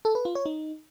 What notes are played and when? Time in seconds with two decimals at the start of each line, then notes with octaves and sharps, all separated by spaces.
0.05 A4
0.15 B4
0.25 F4
0.35 C#5
0.46 D#4